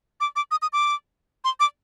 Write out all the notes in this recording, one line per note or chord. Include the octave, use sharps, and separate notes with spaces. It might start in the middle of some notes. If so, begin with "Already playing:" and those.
D6
D6
D#6
D#6
D6
C6
D6